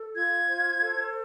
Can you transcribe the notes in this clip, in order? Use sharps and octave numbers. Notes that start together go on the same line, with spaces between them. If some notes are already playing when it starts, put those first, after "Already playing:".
Already playing: A4
F4 G#6
C5
A4